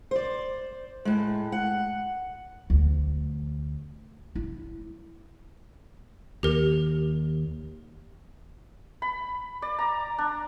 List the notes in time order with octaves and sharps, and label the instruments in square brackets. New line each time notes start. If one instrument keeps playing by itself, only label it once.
[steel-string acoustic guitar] C5 D5
A2 G#3
F#5
[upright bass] D2
E4
[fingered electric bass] D#2 [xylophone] G4 A#4
[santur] B5
D5
A#5
D4